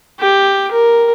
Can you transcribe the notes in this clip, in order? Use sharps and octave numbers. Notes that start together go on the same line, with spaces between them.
G4
A#4